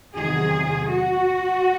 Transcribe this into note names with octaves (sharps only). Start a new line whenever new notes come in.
E2 C3 D#3 F#3 G#4
F#4